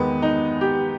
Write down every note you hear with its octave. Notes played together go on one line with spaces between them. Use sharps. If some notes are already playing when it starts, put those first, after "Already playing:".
Already playing: E2 D#3 G#3 B3
D#4
G4